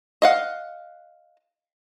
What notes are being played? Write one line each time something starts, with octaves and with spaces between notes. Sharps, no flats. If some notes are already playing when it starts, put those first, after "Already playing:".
D#5 F5 F#5